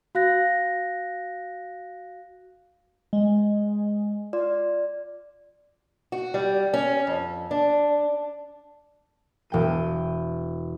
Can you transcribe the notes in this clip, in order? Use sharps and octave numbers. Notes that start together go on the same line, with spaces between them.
F#4 F5 F#6 A#6
G#3
F4 D5
F#4
G3
C#4
F2
D4
E1 G5 D#7